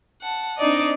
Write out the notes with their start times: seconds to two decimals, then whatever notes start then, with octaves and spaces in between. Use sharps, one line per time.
0.22 F#5 A5
0.59 C4 D4 D#4 D5 D#5